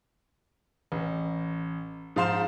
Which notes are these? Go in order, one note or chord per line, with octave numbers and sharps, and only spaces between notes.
A1
G#2 F3 F5 C6 E7